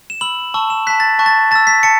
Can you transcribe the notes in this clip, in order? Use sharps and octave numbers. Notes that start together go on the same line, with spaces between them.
E7
B5 E6 F#7
A5 C#6 E6
E7
A5 F#6 B6
A6
A5 C#6 F#6
A6
A5 E6 A6
B6
A5 C#7